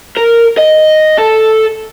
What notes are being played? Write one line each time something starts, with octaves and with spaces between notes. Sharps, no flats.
A#4
D#5
A4